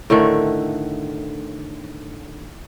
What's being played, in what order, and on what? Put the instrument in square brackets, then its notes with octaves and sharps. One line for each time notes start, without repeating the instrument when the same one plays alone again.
[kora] A2 D3 D#3 A3